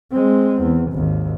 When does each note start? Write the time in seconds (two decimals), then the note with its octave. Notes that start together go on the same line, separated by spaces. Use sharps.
0.12 G#3 C4
0.62 E2
0.92 G#1 D#2